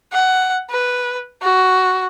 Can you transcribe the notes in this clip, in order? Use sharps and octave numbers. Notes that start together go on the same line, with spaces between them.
F#5
B4
F#4